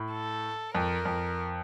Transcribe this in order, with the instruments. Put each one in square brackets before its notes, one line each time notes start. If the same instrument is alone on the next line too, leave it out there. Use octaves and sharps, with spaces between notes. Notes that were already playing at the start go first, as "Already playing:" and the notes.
Already playing: [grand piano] A2
[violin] A4
[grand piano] F2 [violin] A#4
[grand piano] F2